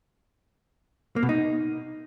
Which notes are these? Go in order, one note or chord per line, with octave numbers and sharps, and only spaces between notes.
A#3
B2
D#4